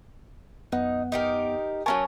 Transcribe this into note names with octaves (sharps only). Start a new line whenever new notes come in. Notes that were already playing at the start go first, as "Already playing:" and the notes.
F#2 B3 D#4 F#5
D#4 G4 A#4
F#3 C#4 A#4 G#5 A5 C#6